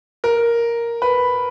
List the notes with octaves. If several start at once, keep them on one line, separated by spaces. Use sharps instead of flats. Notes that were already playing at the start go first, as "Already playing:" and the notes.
A#4
B4